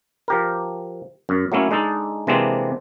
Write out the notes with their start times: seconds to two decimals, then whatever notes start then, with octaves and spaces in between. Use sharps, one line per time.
0.28 F3 G4 A#4
1.29 F#2
1.52 F#3 A3 A#3 C#4 E4
1.71 G#3 D4 D#4 A4
2.27 C3 E3 G#3 A#3 C4 D4